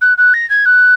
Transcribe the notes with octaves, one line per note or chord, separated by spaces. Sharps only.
F#6
F#6
A#6
G#6
F#6